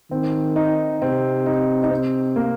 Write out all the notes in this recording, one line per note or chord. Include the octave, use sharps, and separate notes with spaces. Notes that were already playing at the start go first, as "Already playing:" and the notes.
D#3 C4
D#4
C3 C4
D#4
D#4
C4
A#3